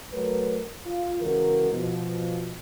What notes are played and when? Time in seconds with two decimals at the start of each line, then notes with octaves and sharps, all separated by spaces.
0.13 F#3 A3 A#4 B4
0.86 F4
1.21 C#3 E3 G#3 F#4 A#4
1.72 B2 F3